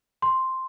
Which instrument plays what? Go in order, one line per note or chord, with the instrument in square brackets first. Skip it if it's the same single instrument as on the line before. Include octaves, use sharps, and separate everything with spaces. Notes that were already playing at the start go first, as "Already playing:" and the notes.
[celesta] C6